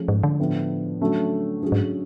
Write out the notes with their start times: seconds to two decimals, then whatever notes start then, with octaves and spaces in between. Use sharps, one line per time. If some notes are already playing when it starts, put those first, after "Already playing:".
Already playing: F3 A3 C#4 G#4
0.08 G#2
0.23 D3
0.39 A2 F3 B3 D4
1.01 D3 F#3 A3 C#4
1.62 D3 F#3 C#4 G#4
1.72 G#2